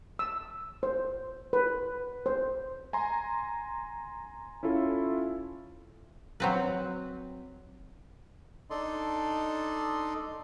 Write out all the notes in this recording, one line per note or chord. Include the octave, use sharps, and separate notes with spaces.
E6
C5
B4
C5
G#5 A#5 C6
C#4 E4 F4 A4
F#3 C4 B4
D4 D#4 A4 D5 D#5 C6